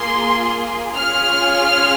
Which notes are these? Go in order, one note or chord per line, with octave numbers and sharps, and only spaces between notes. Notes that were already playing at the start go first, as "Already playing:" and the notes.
Already playing: A#3 F4 G#4 C6
C#4 F4 G#4 F6